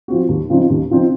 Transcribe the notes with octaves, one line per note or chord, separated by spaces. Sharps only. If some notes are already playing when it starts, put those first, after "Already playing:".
F3 C4 F#4
D#2
C#3 F3 C4 D#4
D#2
C#3 F3 C4 D#4